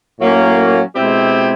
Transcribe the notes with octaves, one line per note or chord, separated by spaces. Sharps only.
A2 F#3 A#3 C#4
B2 G#3 C4 E4 G4